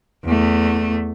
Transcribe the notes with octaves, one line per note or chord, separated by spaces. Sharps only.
E2 A3